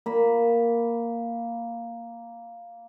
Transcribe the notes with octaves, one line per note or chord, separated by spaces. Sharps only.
A#3 B5